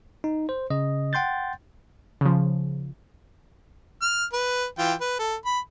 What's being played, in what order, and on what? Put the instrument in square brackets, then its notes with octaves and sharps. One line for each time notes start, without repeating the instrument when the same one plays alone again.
[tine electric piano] D#4
C5
C#3 D#5
F#5 G5 C6 G6 A6
[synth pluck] C#3 F3
[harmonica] F6
B4
E3 F4 G5
B4
A4
B5